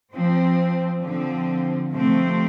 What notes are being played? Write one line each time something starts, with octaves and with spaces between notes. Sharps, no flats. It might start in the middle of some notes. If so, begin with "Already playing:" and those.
F3 C4
D3 F3 C4
C3 F3 A3 C4